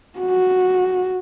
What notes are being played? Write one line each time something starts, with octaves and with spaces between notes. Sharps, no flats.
F#4